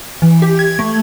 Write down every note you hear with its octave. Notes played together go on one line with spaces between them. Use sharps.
E3
G4
G#6
A3